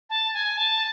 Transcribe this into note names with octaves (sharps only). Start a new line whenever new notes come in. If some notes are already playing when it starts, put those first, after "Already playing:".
A5
G#5
A5